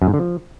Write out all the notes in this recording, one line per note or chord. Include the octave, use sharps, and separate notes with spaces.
F#2
G#2
D3
F3